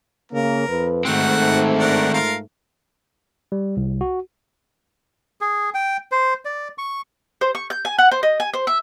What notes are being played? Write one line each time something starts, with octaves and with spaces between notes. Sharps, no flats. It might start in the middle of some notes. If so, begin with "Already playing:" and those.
C#3 A#3 A#4
F2 B4
G#2 D#3 A3 C4 F#4 F#5
D4 A#4 F#5
F4 A#4 F5
G3
C2
F#4
G#4
G5
C5
D5
C#6
C5
C#6
G6
G#5
F#5
C5
D#5
G#5
C5
E5